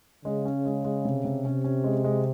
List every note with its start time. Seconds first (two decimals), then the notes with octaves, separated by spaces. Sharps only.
0.25 C#3 G#3
0.45 C#4
0.65 G#3
0.85 G#3
1.05 C3
1.25 C3
1.44 C3 C#4
1.64 C#4
1.84 G#3
2.04 G#3